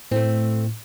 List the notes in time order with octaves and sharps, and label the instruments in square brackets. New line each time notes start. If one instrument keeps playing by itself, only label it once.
[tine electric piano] A2 [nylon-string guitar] A3 C4